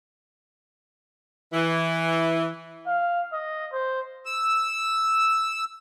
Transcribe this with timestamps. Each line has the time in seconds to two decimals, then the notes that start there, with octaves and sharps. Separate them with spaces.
1.53 E3
2.87 F5
3.33 D#5
3.73 C5
4.26 E6